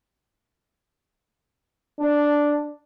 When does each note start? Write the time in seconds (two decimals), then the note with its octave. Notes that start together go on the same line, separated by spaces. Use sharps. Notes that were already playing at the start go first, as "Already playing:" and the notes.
1.99 D4